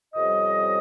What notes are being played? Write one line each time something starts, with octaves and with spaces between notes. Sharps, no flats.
F2 C3 G3 C#4 D#5